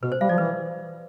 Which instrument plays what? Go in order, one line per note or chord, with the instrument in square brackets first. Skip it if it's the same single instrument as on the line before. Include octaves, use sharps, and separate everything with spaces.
[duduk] B2 [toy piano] B4
[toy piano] C5
[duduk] G3 [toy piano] F5
[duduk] F3 [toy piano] D5
[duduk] E3 [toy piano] B4